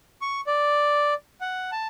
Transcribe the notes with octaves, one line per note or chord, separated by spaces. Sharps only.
C#6
D5
F#5
A5